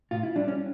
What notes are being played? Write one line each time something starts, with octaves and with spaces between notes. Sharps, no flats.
A2 F4
E4
G3 D4
C#4